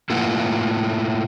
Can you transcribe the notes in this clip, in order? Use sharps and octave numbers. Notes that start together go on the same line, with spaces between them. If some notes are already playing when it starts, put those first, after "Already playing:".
A2 A#3 E4 F4 B4 F#5